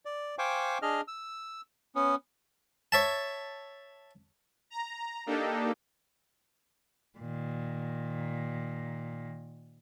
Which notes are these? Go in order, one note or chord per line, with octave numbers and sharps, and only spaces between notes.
D5
C5 F5 G5 G#5 C#6 D6
D4 G#4 D#5 F6
E6
B3 C#4
C#5 E5 A5
A#5
A#3 D4 D#4 G4 A4
A#2 D#3